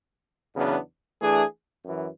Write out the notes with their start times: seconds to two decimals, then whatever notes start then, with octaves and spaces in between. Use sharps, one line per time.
0.55 E2 C#3 F#3 B3 D4
1.20 E3 A3 D4 G#4
1.84 F#2 E3